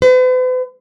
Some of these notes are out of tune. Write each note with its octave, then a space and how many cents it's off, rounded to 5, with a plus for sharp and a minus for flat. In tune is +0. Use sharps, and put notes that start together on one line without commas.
B4 +45